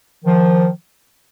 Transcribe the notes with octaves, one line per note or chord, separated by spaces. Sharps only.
D#3 F3